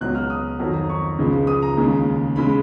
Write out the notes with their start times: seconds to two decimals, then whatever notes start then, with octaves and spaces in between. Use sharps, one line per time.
0.01 C#2 B2 F#3 F#6
0.15 F6
0.30 D#6
0.59 F2 D#3 F#3
0.90 C#6
1.18 C#2 C#3 F3 G#3
1.47 D#6
1.62 A#5
1.77 D#2 C#3 G#3
2.36 C#3 G#3 B5